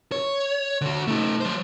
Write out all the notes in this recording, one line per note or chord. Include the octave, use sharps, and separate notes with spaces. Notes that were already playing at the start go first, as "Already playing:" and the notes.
C#5
D3 F#4
A3 D#4
F#3 C5